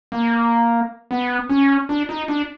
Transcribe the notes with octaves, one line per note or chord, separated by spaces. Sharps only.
A#3
B3
C#4
D4
D#4
D4